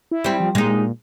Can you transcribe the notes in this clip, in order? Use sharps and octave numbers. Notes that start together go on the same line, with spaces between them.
E4
G3 C4
F3
A#2 G#3 D#4